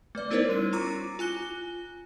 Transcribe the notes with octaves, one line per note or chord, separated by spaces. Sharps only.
A3 B4 D5
B3 D#4 E4 A#4 C5 C#5
G3 C#4 D#7
E4 F4 A#5 C#6 D6 E6
F4 G#5 F#6 G7